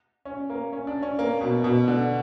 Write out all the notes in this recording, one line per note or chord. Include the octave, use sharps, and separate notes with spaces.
C#4
A#3
C#4
D4
C#4
A#3
B2
B2
D3